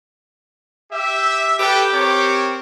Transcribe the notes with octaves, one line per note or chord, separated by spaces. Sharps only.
G4 E5
G4 A4 B4 G5
C4 A#4 C#5